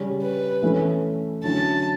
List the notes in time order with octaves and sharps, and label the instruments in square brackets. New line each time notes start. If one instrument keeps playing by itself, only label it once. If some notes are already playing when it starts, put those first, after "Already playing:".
Already playing: [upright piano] C#3 G3 C#4
[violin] B4
[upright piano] E3 A3 C#4
[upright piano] D3 F#3 C#4 E4 [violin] A5